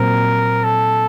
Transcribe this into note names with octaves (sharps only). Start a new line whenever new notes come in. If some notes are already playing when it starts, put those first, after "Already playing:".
Already playing: A#2 F#3 C4 A#4
A4